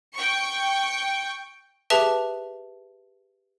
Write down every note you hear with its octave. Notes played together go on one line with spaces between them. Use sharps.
G5 C#6
G4 G#4 B4 E5 A5